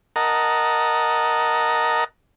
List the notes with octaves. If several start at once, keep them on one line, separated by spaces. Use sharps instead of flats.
A#4 D#5 F#5 A5 A#5